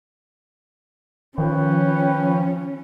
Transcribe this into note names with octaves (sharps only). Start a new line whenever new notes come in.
D#3 F3 C#4 B4 C#5 G5